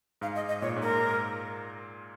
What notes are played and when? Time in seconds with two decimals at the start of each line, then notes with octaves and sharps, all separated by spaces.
0.21 G#2 F5
0.36 D#5
0.48 D#5
0.62 A#2 C#5
0.76 G#2
0.82 A#4